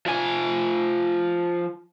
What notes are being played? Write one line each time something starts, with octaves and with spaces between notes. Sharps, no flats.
F3 G#5